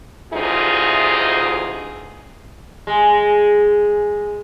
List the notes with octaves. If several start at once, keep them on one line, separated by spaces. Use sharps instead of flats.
D2 C3 E3 D#4 F4 G#4
G#3